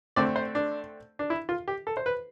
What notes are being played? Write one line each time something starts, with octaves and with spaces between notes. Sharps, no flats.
D3 A3 C4 D5
C5
D4
D4
E4
F4
G4
A4
C5
B4